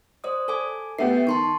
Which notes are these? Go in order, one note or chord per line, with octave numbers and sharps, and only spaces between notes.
C5 D5 D#6
A4 G#5 D6
A3 B3 G4 C7
D#3 A5 C6 C#6